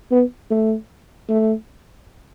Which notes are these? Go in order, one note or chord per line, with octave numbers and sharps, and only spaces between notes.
B3
A3
A3